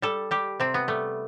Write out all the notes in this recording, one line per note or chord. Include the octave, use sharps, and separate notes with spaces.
G3 A4
G3 G4
C3 C4
B3
G3 A3